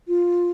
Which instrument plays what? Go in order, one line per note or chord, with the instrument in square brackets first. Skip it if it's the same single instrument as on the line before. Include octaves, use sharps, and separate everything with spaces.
[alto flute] F4